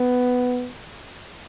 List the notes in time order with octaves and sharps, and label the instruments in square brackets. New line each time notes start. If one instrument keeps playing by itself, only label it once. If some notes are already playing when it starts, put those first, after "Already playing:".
Already playing: [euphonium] B3